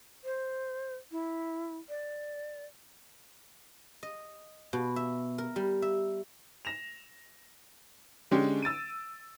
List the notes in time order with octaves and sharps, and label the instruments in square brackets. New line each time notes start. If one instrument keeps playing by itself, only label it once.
[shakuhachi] C5
E4
D5
[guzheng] D#5
B2
E5
A#4
G3
E5
[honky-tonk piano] A#6 E7 F7
D3 G#3 C#4 G4
E6 A6 D7 D#7